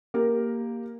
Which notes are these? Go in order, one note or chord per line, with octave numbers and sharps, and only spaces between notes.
A#3 G4 A#4